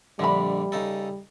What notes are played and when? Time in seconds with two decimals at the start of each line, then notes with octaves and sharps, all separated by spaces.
0.19 A#1 D3 G3 D#5 E5 B5
0.72 C#3 D#4 A4